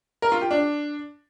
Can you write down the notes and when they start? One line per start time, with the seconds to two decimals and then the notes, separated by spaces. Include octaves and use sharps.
0.22 A#4
0.32 F4
0.41 G4
0.51 D4